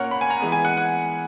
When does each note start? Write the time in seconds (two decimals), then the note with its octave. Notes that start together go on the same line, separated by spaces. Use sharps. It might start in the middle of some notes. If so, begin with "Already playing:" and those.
Already playing: A#2 A#3 C#4 A#4 C#5 F#5
0.11 B5
0.21 G#5
0.30 A#5
0.40 E3 G#3 B3
0.52 G#5
0.65 F#5
0.77 F#5